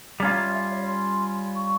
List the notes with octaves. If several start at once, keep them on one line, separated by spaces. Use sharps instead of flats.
G3 C#4 F4 A#5
E5
E5
C#5
C6
C#6